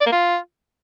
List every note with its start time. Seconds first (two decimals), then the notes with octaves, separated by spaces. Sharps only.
0.01 D5
0.07 A#3
0.12 F4